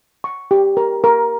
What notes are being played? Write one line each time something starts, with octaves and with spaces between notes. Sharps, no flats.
C#6
G4
A#4
A#4